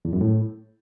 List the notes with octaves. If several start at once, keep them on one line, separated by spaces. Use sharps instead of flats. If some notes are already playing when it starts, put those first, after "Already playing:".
E2
F#2
A2